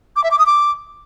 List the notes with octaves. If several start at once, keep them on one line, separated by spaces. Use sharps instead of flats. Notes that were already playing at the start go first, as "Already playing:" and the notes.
D6
E5
D6
D#6
D6